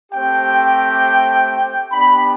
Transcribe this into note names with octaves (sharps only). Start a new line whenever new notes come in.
A3 C4 G4 G5
B3 D4 G4 B5